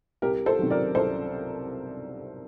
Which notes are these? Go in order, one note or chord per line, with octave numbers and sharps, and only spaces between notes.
C2 G4 A#4
A4 C5
C3 D#3 F#3
A#4 D5
C2 A4 C5